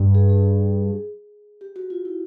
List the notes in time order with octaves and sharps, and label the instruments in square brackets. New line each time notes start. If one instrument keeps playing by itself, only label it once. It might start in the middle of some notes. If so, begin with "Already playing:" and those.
Already playing: [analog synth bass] G2
[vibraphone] G#4
G#4
G4
F#4
F4
E4